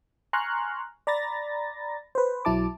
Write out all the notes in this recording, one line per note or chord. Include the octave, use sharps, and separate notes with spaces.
G#5 A#5 C6 C#6 F6 F#6
D5 A#5 B5 A6 A#6
B4 C5
B1 F#3 E4 A5 D6